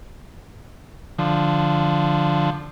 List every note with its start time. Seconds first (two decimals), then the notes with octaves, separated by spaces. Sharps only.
1.19 D3 F3